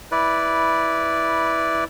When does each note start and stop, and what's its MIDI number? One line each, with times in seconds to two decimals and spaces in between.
0.12 1.84 64
0.12 1.84 71
0.12 1.84 74